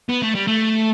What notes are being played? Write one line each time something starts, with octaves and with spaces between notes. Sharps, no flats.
B3
A3
G3
A3